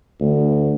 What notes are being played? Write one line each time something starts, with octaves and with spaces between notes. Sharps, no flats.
D2